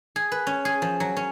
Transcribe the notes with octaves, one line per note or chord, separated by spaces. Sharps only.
G#4
B4
C#4
G#4
F3
F#3
C#4